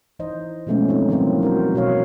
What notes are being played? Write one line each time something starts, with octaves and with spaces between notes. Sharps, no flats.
E3 D#4 C5 D#5
B2 F3 G#3 A3 B3 C#4
F3 C4 D#4 A4
D#3 E3 F#3 A#3 C4
D4 F#4 A#4 C5
B2 F#4 C5 C#5 F5